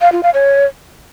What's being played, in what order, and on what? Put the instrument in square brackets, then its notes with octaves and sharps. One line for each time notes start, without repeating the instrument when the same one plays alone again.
[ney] F5
F4
F5
C#5